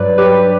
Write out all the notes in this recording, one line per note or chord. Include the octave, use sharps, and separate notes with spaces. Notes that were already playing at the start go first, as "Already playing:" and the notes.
Already playing: G2 F#3 B4 D5
F#3 G4 B4